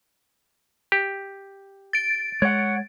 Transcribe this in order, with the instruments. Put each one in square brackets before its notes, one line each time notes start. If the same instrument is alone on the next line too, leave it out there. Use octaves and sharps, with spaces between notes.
[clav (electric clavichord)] G4
[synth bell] A6 D7
[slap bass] G#3 [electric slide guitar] C#5 F#5